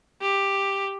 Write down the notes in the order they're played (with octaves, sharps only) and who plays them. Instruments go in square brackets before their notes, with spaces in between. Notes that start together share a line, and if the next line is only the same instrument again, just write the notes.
[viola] G4